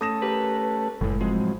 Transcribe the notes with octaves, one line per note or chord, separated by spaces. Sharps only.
A3 C#4 A4 D#6 A#6 E7
G4 A#4 B4
F#1 A2 C#3 G#3
F3 F#3 G#3 C4